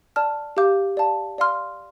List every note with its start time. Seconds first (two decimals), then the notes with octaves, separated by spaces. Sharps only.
0.16 D5 A5 F6
0.57 G4 F5 D6 G6
0.97 D5 F5 A5
1.38 D5 F5 C6 F6